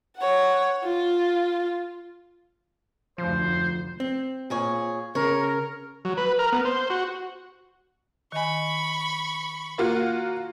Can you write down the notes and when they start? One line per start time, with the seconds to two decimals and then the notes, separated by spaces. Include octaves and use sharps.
0.17 C#5 F#5
0.84 F4
3.18 F1 D2 F3 C5
4.00 C4
4.50 A#2 G#4 C#5
5.15 C#3 A#4 C#5
6.05 F#3
6.17 B4
6.39 A#4
6.52 B3
6.65 C5
6.90 F#4
8.32 D#3 D#5 G#5 B5 C#6
9.78 A#3 F4 F#4